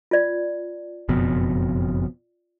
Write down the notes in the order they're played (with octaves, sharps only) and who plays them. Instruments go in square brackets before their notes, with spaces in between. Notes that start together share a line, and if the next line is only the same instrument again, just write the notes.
[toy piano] F4 D5
[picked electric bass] F#1 F2 B2